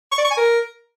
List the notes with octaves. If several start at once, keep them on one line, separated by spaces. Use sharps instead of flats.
C#6
D5
C#6
G#5
A#4